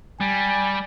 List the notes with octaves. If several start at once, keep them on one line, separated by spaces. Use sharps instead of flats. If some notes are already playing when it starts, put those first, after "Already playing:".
G3 G#5